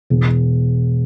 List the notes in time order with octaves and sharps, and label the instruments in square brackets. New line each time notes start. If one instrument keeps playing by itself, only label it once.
[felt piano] E1